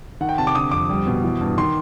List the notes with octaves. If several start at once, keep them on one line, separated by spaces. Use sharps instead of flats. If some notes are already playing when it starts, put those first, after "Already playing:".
D#3 F#5
G5
C3 A5
D6
D3 D#6
F2 D6
G3
B2
E3
G2
D#3 C6